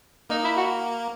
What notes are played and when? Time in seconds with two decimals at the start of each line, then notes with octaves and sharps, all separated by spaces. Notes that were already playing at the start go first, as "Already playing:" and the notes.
0.30 A#3 D#4
0.44 E4
0.57 F#4